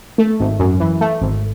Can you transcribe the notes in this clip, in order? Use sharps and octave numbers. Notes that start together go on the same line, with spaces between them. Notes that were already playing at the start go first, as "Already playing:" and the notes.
A3
G#1
F#2
E3
A3
G#1